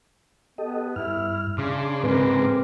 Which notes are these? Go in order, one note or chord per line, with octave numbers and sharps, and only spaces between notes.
B3 G4 A4 D#5
G2 E4 F6
C#3 D4 G#4 C6 D6
G#2 C#3 C4 A#4 B4